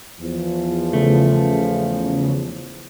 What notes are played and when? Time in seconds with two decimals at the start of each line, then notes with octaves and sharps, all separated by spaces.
0.20 E2 F3
0.93 C#3 A3